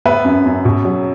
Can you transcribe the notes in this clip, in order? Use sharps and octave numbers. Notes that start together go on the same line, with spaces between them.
B3 B4 E5
F#2
F#2
B2
F#3